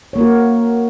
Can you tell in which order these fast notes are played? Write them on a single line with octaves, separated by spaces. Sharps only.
C#5 A#3 A#4 F#4